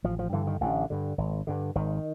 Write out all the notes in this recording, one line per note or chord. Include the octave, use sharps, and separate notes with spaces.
A1 F3
F3
G2 D3 E3
D#3
A1 D3
G2 D3
G#1
G2 D3
G#1 D#3